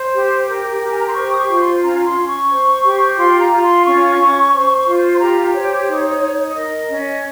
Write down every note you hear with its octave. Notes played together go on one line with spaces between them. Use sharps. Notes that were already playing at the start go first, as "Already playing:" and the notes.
Already playing: C5
G4
A#4
G4
G#5
A#5
C6
C5 C#6
D#6
C#6
F4
C6
C#4 A#5
C6
C#4
C#6
C5
G4
F4 C6
A#5
F4
C6
C#4 C#6
C#4
C5
F4
C6
G4 A#5
C5 C#5
D#4
D#4
A#4 D#5
C#4